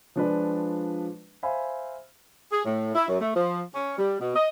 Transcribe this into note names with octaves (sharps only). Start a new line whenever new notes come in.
F3 G#3 D4 F4 B4 D5
C5 E5 F5 G#5 B5
G#4
A2
E4
F#2
A3
F3
C#4
G3
B2
D#5